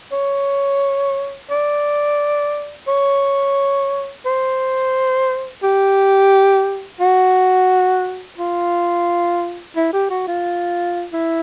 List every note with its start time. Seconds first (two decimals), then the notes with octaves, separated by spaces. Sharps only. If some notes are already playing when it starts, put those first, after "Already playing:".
0.12 C#5
1.50 D5
2.87 C#5
4.26 C5
5.63 G4
7.00 F#4
8.38 F4
9.76 E4
9.93 G4
10.10 F#4
10.27 F4
11.13 E4